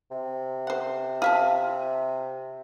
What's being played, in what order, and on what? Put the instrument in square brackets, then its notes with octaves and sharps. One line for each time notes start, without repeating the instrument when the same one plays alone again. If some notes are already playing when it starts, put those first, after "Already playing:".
[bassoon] C3
[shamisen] C5 F#5
F4 E5 A5